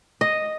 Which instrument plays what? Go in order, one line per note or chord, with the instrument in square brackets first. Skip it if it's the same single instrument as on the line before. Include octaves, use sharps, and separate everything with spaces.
[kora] D#5